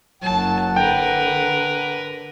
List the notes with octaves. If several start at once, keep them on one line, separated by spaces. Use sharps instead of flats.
F#1 F#3 F#5 A5
D3 A#4 B4 G5